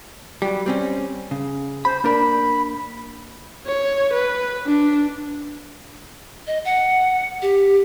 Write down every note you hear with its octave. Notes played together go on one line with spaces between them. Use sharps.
F#3 G3
G3 C4 C#4
C#3
C5 B5
A#3 D4 A#4 B5
C#5
B4
D4
D#5
F#5
G4